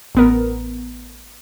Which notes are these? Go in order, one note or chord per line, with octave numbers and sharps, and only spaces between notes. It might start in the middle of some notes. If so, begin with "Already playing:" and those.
A1 B3 A#4